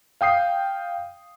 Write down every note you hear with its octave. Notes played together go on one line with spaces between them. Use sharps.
F5 G5 D#6 C7